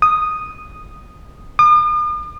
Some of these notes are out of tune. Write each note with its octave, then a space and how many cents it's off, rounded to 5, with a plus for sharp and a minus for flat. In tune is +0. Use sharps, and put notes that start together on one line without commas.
D#6 -5
D#6 -45